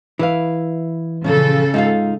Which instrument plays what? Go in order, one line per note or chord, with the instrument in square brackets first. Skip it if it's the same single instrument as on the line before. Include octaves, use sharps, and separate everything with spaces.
[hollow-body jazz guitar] E3 [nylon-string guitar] E4 B4 F5
[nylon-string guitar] A#2 F3 C#4 [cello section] C#3 A4
[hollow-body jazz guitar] G#2 [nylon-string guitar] D#4 F4 F5